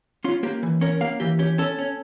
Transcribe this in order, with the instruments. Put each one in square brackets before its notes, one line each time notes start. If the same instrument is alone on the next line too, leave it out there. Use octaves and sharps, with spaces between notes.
[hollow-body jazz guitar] C#4 F4
A#3 G4
E3
C#4 A#4
A#3 F5
E3 G4
C#4 G4
C#4 A4
C#4